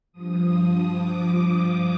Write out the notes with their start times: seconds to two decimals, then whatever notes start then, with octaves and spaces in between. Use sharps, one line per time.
0.13 G2 F3 D#6
0.53 D#6
0.93 D6